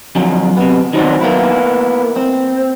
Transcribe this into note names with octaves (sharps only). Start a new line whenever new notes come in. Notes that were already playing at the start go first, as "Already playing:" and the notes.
F2 D3 F#3
C3 B3
D#3 F#3 C4 D4 F#4
A#3 B3 E4
C4